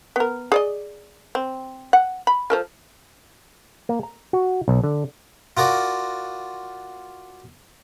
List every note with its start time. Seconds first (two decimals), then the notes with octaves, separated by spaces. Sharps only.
0.16 B3 A#4
0.52 G#4 D5 D#5
1.35 C4
1.93 F#5
2.27 B5
2.50 F3 A4 A#4
3.89 A#3
4.03 A#5
4.33 F#4
4.68 B1
4.84 D3
5.57 F4 F#4 A#4 D5